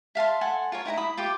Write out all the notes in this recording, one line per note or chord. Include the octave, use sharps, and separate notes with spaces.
E5 F5 A5 C6
A4 F#5 G#5 C6
F4 A#4 C#5
D#4 E4 G5 A#5
E4 B5 D#6
F4 G4 G5 D6